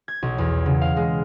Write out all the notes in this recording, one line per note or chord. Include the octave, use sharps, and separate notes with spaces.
G#6
B1
E2
C#3
F5
G#3